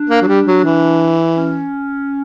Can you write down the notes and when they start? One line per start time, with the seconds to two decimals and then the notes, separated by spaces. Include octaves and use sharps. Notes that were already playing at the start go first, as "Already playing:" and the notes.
Already playing: D4
0.10 A#3
0.22 F#3
0.27 G3
0.46 F#3
0.64 E3
1.36 C#4